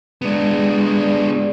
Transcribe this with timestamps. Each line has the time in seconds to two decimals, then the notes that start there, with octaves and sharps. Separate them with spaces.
0.22 G#3 B3 D4